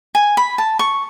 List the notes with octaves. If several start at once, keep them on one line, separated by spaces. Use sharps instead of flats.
G#5
B5
A5
C#6